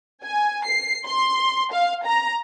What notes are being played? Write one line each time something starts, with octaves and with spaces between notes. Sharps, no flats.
G#5
C7
C6
F5
A#5